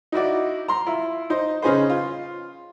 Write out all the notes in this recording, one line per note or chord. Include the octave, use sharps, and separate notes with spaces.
D#4 E4 F#4 D5
A#5 C6
E4 F4
D#4 C5
C#3 C#4 D#4 G#4 B4 C5
F4